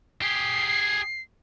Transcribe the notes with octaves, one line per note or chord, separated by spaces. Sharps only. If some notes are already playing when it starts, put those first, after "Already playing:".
G4 G#4 C7